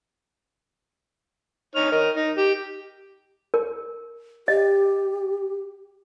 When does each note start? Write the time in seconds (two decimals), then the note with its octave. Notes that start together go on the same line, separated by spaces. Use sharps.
1.75 D#4 C#5 F6
1.92 A#4 D#5
2.16 D#4
2.37 G4
3.54 A#4
4.48 G4 D#5